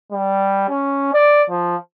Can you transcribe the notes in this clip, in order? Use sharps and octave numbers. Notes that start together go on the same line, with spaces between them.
G3
C#4
D5
F3